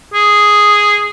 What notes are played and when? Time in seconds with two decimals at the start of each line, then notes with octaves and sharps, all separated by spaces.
0.14 G#4